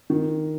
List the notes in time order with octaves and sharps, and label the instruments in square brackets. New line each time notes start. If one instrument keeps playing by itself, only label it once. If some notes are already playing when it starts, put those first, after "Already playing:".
[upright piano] D#3